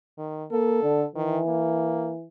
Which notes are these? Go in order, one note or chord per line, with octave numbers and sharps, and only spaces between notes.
D#3
A#3 A4
D3
D#3 E3
A#3